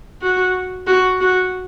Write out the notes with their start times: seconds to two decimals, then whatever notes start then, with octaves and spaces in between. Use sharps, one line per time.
0.22 F#4
0.87 F#4
1.21 F#4